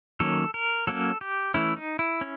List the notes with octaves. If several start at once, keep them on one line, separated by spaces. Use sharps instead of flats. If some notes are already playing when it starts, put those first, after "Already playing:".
D#3 F#3 A#3 C#4 A4
A#4
F#3 A#3 C#4 A4
G4
E3 A3 C#4 E4
D#4
E4
C#4